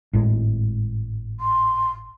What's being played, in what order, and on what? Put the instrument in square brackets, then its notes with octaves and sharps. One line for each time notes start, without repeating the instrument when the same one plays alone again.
[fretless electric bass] G#1 A2 G#3
[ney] C6